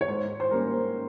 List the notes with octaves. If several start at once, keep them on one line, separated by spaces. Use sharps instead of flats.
C#5
G#2 C5
C5
G3 A#3 C#4 A#4